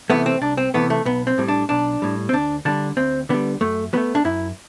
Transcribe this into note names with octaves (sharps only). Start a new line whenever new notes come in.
C3 E3 A3 B3
C4
C2 D4
C4
C3 E3 A3 B3
A3
B1 B3
C4
A2 G3
D4
B1 D4
A2 G3
C4
D2 D4
D3 G3 D4
D2 C4
D3 G3 B3
F#2 A3
F#3 A3 B3
D4
F#2 E4